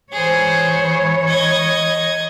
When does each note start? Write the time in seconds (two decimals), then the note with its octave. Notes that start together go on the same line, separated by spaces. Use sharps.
0.12 E3 G#4 C5 C#5
1.28 D#5 G#6